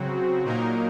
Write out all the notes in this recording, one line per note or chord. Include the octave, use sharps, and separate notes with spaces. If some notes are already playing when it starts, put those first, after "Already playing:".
Already playing: C#3 F#3 C4 F#4
A#2 F#3 A#3 D#4 A#4